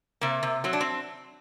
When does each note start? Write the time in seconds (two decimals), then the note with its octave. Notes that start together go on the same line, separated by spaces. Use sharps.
0.21 C3 A#3
0.43 C3
0.64 F#3 C4
0.73 D4
0.81 C4